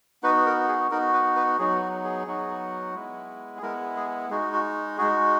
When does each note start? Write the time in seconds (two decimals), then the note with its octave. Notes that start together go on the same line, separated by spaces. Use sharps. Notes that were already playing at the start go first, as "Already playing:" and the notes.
0.23 B3 D#4 F#4 B4
0.46 A#4
0.68 G#4
0.91 B3 D#4 F#4 A#4
1.14 B4
1.36 B4
1.59 F#3 B3 D#4 F#4 G#4
1.82 F#4
2.04 G#4
2.27 F#3 B3 D#4 F#4
2.95 G#3 B3 E4
3.58 G#4
3.62 G#3 B3 E4 A#4
3.96 G#4
4.30 G#3 D#4 F#4 G#4
4.53 F#4
4.98 G#3 D#4 F#4 G#4